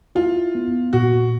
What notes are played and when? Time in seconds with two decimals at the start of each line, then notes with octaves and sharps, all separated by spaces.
0.15 E4 F4
0.55 B3
0.93 A#2 F#4